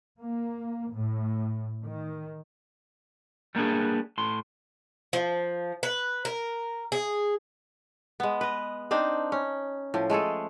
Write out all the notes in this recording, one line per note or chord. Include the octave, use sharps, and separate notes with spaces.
A#3
A2
D#3
G3 A#3 B3 D4 G#4
A2 C6
F3
B4
A#4
G#4
G#3 B3
B4 D#5
C4 D4 D#4 C5
C#4
A2 F3
G#3 A3 G#4 A4